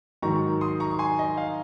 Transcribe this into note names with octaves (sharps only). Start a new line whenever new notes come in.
G#2 D#3 F#3 A#5 C#6
C6 D#6
A#5 C#6
C#6
G#5 C6
D#5
F5